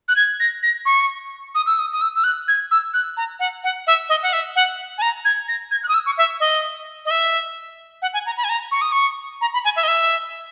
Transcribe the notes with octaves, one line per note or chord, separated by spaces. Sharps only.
F#6
G#6
A#6
A#6
C#6
D#6
E6
D#6
D#6
E6
E6
F#6
G#6
E6
F#6
A#5
F#5
F#5
E5
D#5
F#5
E5
F#5
G#5
A#5
G#6
A#6
G#6
F#6
D#6
E6
C#6
E5
D#5
D#5
E5
F#5
G#5
A#5
B5
G#5
A#5
C#6
D#6
C#6
A#5
B5
G#5
E5
D#5
E5